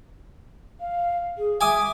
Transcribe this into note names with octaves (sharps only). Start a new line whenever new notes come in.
F5
G#4
E5 G#5 D6 D#6